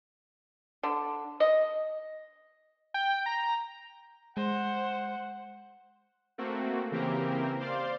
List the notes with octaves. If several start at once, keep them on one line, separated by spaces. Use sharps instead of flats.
D3
D#5
G5
A#5
G#3 C5 F#5
A3 A#3 C4 F#4
C#3 E3 A#3 C4 G4 A#4
C5 D5 F5 C6